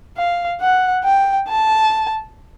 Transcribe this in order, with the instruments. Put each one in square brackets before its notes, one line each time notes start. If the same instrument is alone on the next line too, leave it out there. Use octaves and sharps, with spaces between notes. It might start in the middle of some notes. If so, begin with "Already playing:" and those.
[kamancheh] F5
F#5
G5
A5